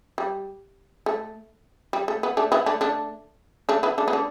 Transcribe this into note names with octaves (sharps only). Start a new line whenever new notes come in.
G3
A3
G3
A3
B3
A3 D4
B3 E4
A3 D4
A3 D4
A3 D4
B3 E4
A3 D4
B3
A3 D4